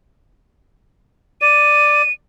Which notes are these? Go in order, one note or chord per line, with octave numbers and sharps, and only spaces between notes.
D5 D#7